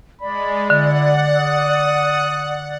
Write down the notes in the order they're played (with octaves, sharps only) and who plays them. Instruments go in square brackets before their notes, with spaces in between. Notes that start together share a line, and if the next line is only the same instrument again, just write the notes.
[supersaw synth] G#3 [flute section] D5 [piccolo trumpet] B5
[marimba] D3 [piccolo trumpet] E4 [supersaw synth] F#5
[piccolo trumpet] D#6